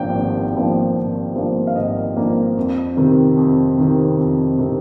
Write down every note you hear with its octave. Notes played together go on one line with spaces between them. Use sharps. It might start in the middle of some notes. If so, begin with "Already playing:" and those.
Already playing: G#1 G2 F3 A#3 G5
G#1
G2 F3 A#3
G#1
G2 F3 A#3
F5
G#1 D#5
G2 F3 A#3
F2
C3 D#3
F2
C3 D#3
F2
C3 D#3